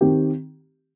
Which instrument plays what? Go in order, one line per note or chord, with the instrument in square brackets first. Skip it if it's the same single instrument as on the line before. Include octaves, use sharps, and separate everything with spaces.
[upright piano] D#3 C4 G4